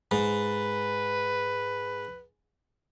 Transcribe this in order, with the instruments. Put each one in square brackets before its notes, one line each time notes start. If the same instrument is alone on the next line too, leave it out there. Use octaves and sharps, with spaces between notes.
[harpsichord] G#2 [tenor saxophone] B4